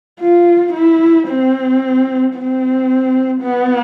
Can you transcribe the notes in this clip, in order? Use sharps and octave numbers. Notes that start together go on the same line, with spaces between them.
F4
E4
C4
C4
B3